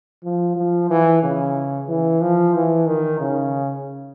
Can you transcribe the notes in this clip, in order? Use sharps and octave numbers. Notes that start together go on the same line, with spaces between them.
F3
F3
E3
C#3
E3
F3
E3
D#3
C#3